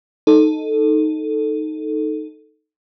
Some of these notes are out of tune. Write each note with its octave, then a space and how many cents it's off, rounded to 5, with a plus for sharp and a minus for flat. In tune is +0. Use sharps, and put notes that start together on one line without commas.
D#4 +0 A4 +0